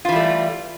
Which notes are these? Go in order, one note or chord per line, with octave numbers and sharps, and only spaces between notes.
E3 G3 A3 F4